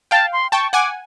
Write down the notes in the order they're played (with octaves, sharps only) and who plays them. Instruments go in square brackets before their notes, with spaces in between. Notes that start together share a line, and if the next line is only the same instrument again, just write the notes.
[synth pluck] F5 G5 [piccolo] A5
[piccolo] C6
[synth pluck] G5 A5 [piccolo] C#6
[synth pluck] F#5 G#5 [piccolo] D6